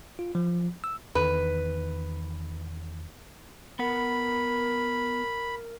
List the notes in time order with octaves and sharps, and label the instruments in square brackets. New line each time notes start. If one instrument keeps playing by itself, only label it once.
[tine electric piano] F4
F3
E6
[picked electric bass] E2 D#3 [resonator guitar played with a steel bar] B4
[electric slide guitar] B3 F#5 [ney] A#4 [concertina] B5